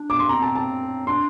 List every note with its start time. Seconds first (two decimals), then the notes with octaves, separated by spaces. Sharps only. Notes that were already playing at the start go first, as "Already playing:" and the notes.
Already playing: D4
0.10 D6
0.19 C6
0.29 C4 A#5
0.42 A5
0.55 A5
1.07 D4 C6